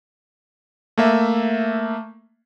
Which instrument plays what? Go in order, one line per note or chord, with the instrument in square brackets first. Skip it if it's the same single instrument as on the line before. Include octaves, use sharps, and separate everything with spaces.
[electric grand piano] A3 A#3 E5